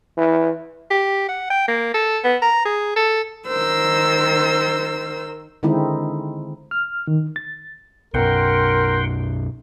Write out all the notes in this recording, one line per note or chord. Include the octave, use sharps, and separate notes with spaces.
E3
G4
F#5
G5
A#3
A4
B3
A#5
G#4
A4
D#3 A#4 C5 E6
D3 D#3 G#3 C4 D#4 E4
F6
D#3
A6
B1 F#2 A#4 F#5 G5 C6